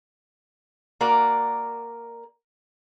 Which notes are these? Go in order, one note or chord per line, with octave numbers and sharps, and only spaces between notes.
A#3 F#4 A#4 D5